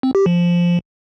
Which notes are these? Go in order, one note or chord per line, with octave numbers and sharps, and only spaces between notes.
C4
G4
F3